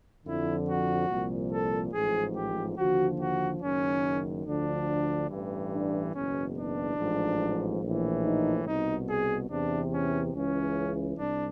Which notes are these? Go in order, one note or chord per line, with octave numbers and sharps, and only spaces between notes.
F2 D3 F3 E4
F#4
C2 A#2 F3
A4
A1 G#2 F3 G#4
G4
D#2 D3 F3 F#4
F#4
F#1 F#2 D#3 C#4
D2 D3 F3 D4
A1 G2 E3
D4
F#1 E2 B2 C#4
D4
A1 G#2 F3
A#1 A2 E3
D#4
C2 B2 D#4
G#4
E2 C3 E3 D4
C#4
C#2 C#3 E3 C#4
C2 D4